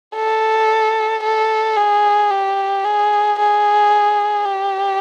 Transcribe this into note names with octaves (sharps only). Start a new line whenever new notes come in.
A4
A4
G#4
G4
G#4
G#4
G4